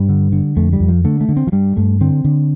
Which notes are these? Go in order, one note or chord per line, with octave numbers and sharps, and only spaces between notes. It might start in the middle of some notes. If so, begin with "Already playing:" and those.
Already playing: G2 G3
D3
D3
F2 A3
G3
F2
F3
D3 A3
A3
D3
C4
F3
G2 G3
G2 A3
D3 C4
D3